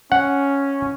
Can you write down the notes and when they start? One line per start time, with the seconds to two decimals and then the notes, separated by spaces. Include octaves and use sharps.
0.12 C#4 F#5